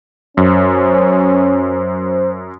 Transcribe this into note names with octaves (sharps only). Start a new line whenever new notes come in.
F#2 C#4 C5